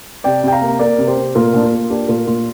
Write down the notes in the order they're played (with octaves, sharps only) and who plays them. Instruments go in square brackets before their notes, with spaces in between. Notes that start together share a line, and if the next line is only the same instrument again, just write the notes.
[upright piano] C3 D5 G5
C3 G5
F5 A#5
A#3
A#3 A#4 D5
C3
G4 C5
C3
A#2 F4 A#4
A#2 D4
F4
A#3
A#3 D4 G4
A#2 F4 A#4
A#2 F4